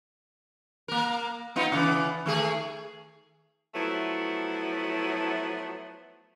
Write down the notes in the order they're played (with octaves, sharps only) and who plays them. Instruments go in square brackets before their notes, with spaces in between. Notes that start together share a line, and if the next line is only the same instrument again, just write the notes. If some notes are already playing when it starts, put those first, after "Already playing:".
[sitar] A#3 A#4
B3 D#4 F4
C#3 E3 B3
D#3 A3 G#4
[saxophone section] F3 F#3 A3 B3 E4